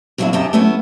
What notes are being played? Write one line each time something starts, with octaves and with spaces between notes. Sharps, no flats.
F#2 B2 F#3 A#3 D4 E4
F#2 D3 G4 D#5 A5 A#5
F#3 A3 B3 C#4 E4